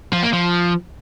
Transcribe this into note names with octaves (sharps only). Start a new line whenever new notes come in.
F3
A#3
F3